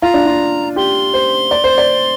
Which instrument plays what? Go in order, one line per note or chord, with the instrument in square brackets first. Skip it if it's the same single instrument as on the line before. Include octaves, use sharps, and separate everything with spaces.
[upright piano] F4 [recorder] A#5
[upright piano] D4
F4
[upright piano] G4 [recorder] C6
[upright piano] C5
D5
C5
D5